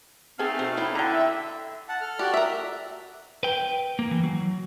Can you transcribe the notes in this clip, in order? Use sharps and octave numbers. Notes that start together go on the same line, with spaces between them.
A3 C4 D#4 G#4 C5 F5 G#5
B2 C5
F3 C4 C#4 E4
D3 G5 A#5
E5
F#5 A5
A4 F6
F#4 G4 D5
A#4 E5
B4 G5
A#3
E3
F#3